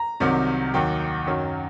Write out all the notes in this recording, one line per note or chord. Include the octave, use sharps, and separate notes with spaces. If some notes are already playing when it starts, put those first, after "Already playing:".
Already playing: A#5
C2 C3 D#3 F#3
D#2 D#3 F#3 G5
F#2 D#3 F#3